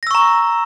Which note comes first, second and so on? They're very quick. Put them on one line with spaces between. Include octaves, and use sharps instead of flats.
A#6 E6 C#6 A#5